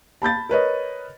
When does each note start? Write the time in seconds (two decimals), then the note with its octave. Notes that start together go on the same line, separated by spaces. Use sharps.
0.22 A5 B5 G6 A6
0.49 A#4 B4 C#5 D#5